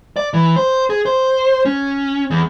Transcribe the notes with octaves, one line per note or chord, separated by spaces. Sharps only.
D5
E3
C5
G#4
C5
C#4
E2